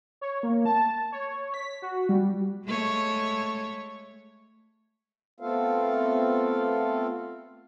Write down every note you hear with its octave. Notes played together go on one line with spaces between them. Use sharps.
C#5
A#3
A5
C#5
B6
F#4
G3
G#3 A3 C#5
A3 B3 C4 F4 A4 F5